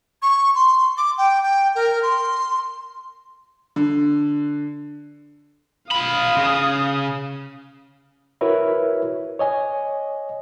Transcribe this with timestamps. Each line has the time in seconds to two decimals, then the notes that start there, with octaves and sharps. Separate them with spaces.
0.22 C#6
0.55 C6
0.97 D6
1.18 G5
1.43 G5
1.75 A#4
2.02 C6
3.76 D3
5.91 F4 F5 B5 D#6
6.37 C#3
8.41 E4 F#4 A#4 B4 C#5 E5
9.39 C#5 D#5 G#5